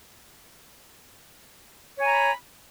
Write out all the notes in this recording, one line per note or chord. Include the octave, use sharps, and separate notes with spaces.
C#5 G#5 A#5 B5